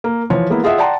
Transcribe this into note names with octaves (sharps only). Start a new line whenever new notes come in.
A#3
E3 F3 C#5
G#3 A#3 B3 E4
F4 G#4 D#5 E5 F#5
D5 F#5 G5 A5 A#5 C6